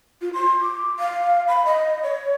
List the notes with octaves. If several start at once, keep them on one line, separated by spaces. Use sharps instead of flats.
F4
C6
D6
F5
B5
D#5
C#5